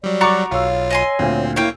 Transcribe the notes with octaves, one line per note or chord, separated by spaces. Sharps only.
F#3 G3 D5
F#4 A#5 C#6 D6 A6
B1 F4 C#5 F5 E6
D#5 G#5 C6
D2 A#2 C4
A#3 E4 C#5 F5 G5